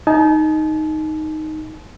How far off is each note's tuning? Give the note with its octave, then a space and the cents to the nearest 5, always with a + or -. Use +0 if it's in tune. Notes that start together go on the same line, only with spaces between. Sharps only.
D#4 +0 A5 -45